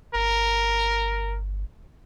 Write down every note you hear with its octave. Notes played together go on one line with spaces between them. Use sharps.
G1 A#4